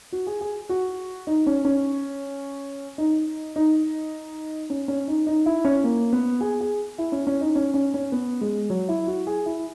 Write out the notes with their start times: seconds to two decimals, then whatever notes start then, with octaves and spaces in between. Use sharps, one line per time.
0.12 F#4
0.27 G#4
0.41 G#4
0.69 F#4
1.27 D#4
1.46 C#4
1.65 C#4
2.98 D#4
3.56 D#4
4.70 C#4
4.88 C#4
5.08 D#4
5.27 D#4
5.46 E4
5.65 C#4
5.84 A#3
6.13 B3
6.41 G#4
6.61 G#4
6.98 E4
7.12 C#4
7.27 C#4
7.41 D#4
7.55 C#4
7.74 C#4
7.94 C#4
8.12 B3
8.41 G#3
8.70 F#3
8.88 E4
9.07 F#4
9.27 G#4
9.46 E4